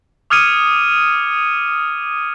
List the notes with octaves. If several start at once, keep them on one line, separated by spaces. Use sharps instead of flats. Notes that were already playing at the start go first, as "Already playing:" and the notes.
D6 D#6 F6 G#6 C#7 D#7